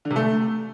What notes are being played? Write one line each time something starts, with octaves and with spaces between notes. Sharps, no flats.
D3
C3
A3